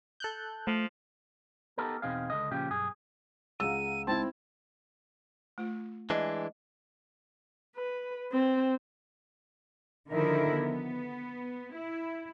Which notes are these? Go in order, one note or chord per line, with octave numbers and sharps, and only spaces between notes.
A4 F#6 G6
F3 A3
B3 D#4 G4 A4 A#4
E2 B2 C4 D#4 G#4 F5
C#2 D3 D#5
A#2 C#3 F3 G4
B1 G2 G#4
C#2 G#4 F5 F#5 A#5 E6 D#7
G#3 C4 D#4 E4 A5 C6
A3 F4
E3 G#3 D4 D#5
B4
C4
D3 D#3 F3 D#4 E4 A#4
B3
E4